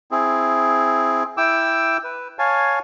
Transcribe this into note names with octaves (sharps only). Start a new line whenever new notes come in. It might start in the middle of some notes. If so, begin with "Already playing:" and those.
C4 E4 G#4
E4 G5 D6 E6
B4
C#5 F5 G#5 A5